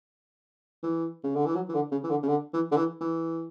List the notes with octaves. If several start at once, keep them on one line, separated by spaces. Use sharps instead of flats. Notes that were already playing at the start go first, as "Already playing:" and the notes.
E3
C#3
D3
E3
F#3
E3
D3
C#3
E3
D3
C#3
D3
E3
D3
E3
E3